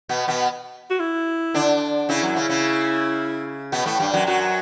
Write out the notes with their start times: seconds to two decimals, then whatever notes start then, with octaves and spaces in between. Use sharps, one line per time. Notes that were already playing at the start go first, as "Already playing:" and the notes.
0.09 B2 B3
0.28 B2 B3
0.90 F#4
1.00 E4
1.54 D3 D4
2.09 C#3 C#4 E4
2.23 F#2 F#3
2.36 C#3 C#4
2.49 C#3 C#4
3.72 B2 B3
3.86 A2 A3
4.00 G2 G3
4.14 F#2 F#3
4.27 F#2 F#3 F#4